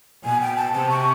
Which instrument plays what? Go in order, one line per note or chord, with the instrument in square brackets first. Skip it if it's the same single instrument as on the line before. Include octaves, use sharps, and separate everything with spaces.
[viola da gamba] B2 [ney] G#5
[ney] G5
A5
[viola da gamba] C3 [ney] A5
[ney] C#6